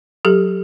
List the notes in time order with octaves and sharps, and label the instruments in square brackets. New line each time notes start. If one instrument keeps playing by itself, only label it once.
[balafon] F#3 G4 A4